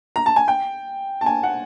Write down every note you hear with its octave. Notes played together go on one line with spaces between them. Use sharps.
A#5
A5
G#5
G5
A5
G#5
F#5